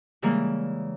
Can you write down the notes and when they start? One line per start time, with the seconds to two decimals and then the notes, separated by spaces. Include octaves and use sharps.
0.22 C#3 E3 G3 G#3 A#3